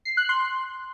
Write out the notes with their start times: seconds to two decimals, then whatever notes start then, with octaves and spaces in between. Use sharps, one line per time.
0.05 C7
0.17 F#6
0.29 C6